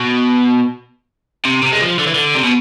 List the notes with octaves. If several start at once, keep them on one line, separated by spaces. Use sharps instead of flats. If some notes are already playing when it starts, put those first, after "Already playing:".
Already playing: B2
C3
C3
G#3
F3
D3
E3
D3
C3
B2